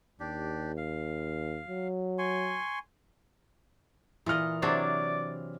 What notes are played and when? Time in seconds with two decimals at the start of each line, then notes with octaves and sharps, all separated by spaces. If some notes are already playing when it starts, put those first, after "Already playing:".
0.20 D#2 D4 G4
0.77 F5
1.68 F#3
2.18 G#5 C6 C#6
4.26 A#2 E3 D#5 F6
4.62 C3 F#3 D4 D5